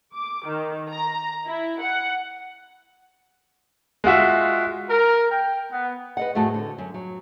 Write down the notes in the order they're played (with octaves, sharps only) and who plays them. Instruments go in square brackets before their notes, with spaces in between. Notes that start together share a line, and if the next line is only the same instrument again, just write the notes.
[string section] D6
D#3
A#5
E4
F#5
[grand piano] G#3 F4 F#4 E5
[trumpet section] A#4
G5
B3
[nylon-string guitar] B4 D#5 F#5
F2 A2 A3 F#4 G#4 A5
D3
F#2
F#3